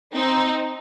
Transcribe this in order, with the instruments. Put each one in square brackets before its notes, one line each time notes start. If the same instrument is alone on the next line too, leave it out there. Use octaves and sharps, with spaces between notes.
[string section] C4 D#4